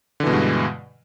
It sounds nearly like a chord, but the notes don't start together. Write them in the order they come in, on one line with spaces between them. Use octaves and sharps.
D3 E3 B2 G#3 G2